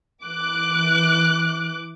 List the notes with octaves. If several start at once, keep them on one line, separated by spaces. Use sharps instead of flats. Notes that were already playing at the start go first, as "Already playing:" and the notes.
E3 D6 F#6